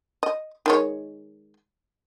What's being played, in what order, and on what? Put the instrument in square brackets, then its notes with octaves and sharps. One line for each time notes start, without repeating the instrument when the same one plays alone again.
[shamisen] D#5
D#3 G#3 C#5